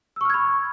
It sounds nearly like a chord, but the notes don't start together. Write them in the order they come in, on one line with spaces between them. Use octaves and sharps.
E6 C#6 F6 G#6 B5